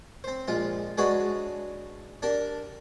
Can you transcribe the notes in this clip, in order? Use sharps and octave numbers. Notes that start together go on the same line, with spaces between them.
C4 C5
A#1 G#3 F4
G#3 D4 F#4 G#4 B4 C#5
D4 G4 A#4